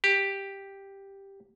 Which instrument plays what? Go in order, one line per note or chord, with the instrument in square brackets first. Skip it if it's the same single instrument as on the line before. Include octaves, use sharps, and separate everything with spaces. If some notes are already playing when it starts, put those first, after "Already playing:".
[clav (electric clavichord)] G4